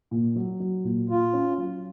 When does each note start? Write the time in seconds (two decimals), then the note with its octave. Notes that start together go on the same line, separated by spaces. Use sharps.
0.11 A#2
0.36 F#3
0.60 F#3
0.84 A#2
1.09 A#2 F4
1.33 C#4
1.58 F#3